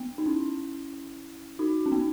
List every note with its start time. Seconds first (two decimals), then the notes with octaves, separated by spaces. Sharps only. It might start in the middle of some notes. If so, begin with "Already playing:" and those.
Already playing: B3
0.18 D#4
0.26 C#4 E4
1.59 D#4 F#4
1.86 C#4
1.92 B3 D#4